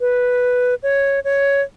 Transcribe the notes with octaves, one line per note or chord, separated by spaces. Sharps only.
B4
C#5
C#5